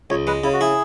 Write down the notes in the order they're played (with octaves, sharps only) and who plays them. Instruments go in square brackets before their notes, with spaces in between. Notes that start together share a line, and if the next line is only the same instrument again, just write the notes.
[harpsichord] C#2 [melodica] C#5
[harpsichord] G#3 [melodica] B4
[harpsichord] C#3 [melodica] E4
[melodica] F#4
[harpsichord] E4 [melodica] G#4